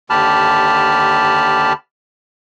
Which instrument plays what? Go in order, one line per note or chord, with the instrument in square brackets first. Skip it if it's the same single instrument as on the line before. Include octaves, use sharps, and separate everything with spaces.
[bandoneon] D#2 D3 G4 A5 B5 F6